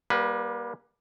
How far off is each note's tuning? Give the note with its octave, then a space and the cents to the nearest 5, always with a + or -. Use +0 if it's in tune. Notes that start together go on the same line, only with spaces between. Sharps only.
G3 +0 A#3 +30 B4 +0